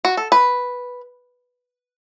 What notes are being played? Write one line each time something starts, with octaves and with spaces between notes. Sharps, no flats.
F#4
A4
B4